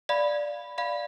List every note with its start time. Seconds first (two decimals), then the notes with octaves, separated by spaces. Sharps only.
0.09 D5 F5 B5
0.78 D5 F5 B5